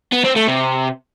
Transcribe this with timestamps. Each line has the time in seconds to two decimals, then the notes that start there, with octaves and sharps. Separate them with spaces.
0.12 B3
0.24 C4
0.36 A3
0.48 C3